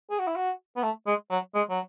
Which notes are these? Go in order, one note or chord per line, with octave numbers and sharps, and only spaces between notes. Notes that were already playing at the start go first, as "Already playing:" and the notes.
G#4
F#4
E4
F#4
B3
A3
G#3
F#3
G#3
F#3